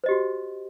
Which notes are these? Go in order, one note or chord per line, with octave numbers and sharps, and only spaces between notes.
F#4 G4 C5 D#5